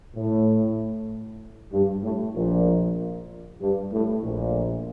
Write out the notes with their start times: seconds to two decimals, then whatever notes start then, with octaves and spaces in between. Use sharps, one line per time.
0.16 A2
1.72 G2
2.03 A2
2.35 A#1 A#2
3.62 G2
3.93 A2
4.23 A#1 A#2